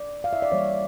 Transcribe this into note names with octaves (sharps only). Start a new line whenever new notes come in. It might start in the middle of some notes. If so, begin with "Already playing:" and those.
Already playing: D5
F5
E5
D5
E3 G3 A#3 C#5